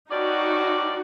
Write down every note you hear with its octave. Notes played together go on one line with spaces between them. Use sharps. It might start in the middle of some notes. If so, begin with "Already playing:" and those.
G2 C#4 D#4 F#4 D5